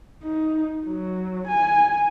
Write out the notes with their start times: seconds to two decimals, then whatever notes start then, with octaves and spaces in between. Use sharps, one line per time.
0.23 D#4
0.86 F#3
1.48 G#5